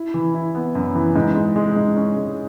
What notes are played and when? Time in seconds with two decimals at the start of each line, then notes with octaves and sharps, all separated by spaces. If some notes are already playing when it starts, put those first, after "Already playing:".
Already playing: E4
0.14 E3
0.34 E4
0.55 B3
0.75 F#2
0.95 E3
1.16 G#2
1.35 G#3
1.56 G#3
1.76 G#2
1.96 C#4
2.16 G#3